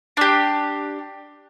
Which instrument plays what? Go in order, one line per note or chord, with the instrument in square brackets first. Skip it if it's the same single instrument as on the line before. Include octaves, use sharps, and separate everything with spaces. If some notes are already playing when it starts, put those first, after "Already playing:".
[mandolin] D4 G4